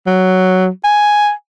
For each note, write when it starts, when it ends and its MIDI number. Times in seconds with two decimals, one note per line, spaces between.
0.07 0.68 54
0.84 1.31 80